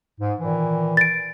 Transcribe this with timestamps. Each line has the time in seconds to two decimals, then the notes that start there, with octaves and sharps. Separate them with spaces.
0.19 G#2
0.39 A#2 D#3 E3
0.97 A6 D7